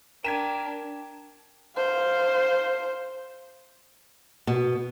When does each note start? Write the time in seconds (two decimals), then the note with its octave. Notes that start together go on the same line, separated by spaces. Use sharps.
0.24 D4 A#4 G5 G#6 B6 E7
1.77 C5 F5
4.47 B2